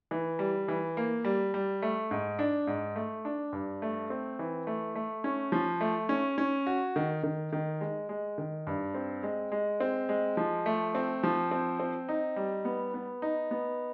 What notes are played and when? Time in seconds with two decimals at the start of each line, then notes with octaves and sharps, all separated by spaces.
0.11 E3
0.39 G3
0.68 E3
0.97 A#3
1.24 G3
1.54 G3
1.82 A3
2.11 G#2
2.39 D4
2.67 G#2
2.96 A3
3.25 D4
3.53 G2
3.82 A3
4.10 C4
4.39 E3
4.67 A3
4.95 A3
5.24 C#4
5.52 F3
5.81 A3
6.09 C#4
6.38 C#4
6.66 F#4
6.96 D#3
7.23 D#3
7.53 D#3
7.81 G#3
8.09 G#3
8.38 D#3
8.67 G2
8.94 C4
9.23 G#3
9.52 G#3
9.80 C4
10.09 G#3
10.37 F3
10.66 A3
10.95 C4
11.23 F3
11.51 C4
11.80 C4
12.09 D#4
12.36 G3
12.65 B3
12.94 B3
13.22 D#4
13.51 B3